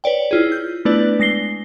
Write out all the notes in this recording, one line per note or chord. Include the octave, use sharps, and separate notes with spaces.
B4 C#5 D5 G5
E4 F4 G#4
G6
A3 B3 D4 E4 B4 D5
G#3 A#6 C7 G7